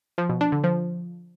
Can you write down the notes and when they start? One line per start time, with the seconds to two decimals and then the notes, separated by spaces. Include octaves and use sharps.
0.18 F3
0.29 B2
0.41 D4
0.52 D3
0.64 F3